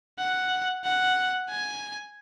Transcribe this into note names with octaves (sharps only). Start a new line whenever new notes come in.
F#5
F#5
G#5